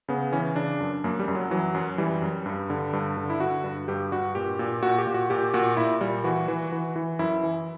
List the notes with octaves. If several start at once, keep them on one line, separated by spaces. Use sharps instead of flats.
C#3 B3
E3 C#4
C#3 D4
F#2
F#2 A#3
G3
F#2
F#3
E3 F#3
F#2
E3 G3
F#2
G2
D3
G2
D3
E4
D3 F#4
G2
G2 G4
G2 F#4
A#2 G4
A#2
A#2 F#4
G4
A#2
F#4
A#2 G4
A#2 F#4
A#2 E4
A#2 G3
E3 F#4
E3
E3
E3
F#2 E4
E3